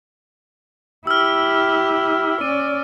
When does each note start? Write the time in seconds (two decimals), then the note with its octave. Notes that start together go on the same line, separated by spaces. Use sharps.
1.07 E4 G4 E6 F6
2.41 C#4 D5 D#7